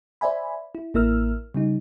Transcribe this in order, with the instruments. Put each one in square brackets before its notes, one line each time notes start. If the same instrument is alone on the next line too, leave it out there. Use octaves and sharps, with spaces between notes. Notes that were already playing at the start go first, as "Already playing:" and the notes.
[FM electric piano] C5 D5 E5 G#5 B5
E4
A1 A#3 E4 A#4 E6 F6
C#3 G3 D#4